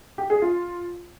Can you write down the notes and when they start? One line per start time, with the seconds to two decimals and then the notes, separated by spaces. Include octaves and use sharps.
0.18 G4
0.30 G#4
0.42 F4